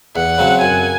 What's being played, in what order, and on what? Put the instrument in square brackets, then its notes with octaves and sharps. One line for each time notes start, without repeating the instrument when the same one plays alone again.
[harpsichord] E2 [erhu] F#5
[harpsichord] C#3 F#3 C4
[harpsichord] F#2 [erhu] G#5